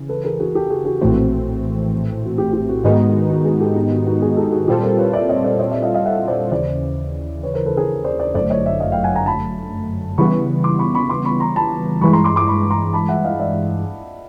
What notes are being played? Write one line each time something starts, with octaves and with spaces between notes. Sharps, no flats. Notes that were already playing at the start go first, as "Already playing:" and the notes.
Already playing: C#3 E3
A4 B4
G#4 A#4
F#4 G#4
G4 A4
F#4 G#4
F#4 G#4
A#1 A2 E3 A3 C4 F#4
F#4
G4
G4
F#4
G#2 D#3 G#3 B3 D#4 F#4
F#4
F#4
F#4 G#4
G4 A4
G4
F#4
F#4
F#4 G#4
G4 A4
F#4 G#4
A#2 G3 C4 F4 G4 A4
A#4 C5
B4 C#5
D5 E5
C#5 D#5
C5 D5
C#5 D#5
D5 E5
D#5 F5
D#5 F5
E5 F#5
C5 D5
D#2 C#3 E3 C5 D5
B4 C#5
A#4 C5
A4 B4
G#4 A#4
C5 D5
C5 D5
G1 F#2 D3 F#3 A3 C5 D5
C#5 D#5
D5 E5
D#5 F5
F5 G5
F#5 G#5
G#5 A#5
A5 B5
C#3 E3 G3 B3 B5 C#6
C6 D6
B5 C#6
B5 C#6
C6 D6
B5 C#6
A#5 C6
A5 B5
G2 E3 G#3 B5 C#6
A#5 C6
C6 D6
C6 D6
B5 C#6
A#5 C6
A5 B5
E5 F#5
D#5 F5
D5 E5